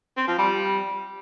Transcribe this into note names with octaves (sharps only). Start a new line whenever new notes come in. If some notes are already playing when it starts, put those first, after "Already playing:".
C4
F3
G3